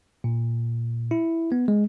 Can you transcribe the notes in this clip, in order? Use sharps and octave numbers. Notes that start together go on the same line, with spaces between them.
A#2
E4
B3
G#3